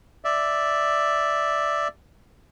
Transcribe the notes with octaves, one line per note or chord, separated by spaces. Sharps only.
D5 E5